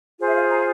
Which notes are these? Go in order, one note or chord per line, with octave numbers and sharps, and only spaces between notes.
F4 G#4 C5
E5
F5
A#5